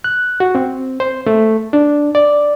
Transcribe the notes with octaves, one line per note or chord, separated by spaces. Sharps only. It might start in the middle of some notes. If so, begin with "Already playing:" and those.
F#6
F#4
C4
C5
A3
D4
D5